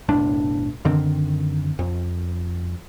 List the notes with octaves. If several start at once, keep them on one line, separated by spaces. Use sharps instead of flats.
F#1 B1 A2 D4
F#2 D3 D#3 C4
F2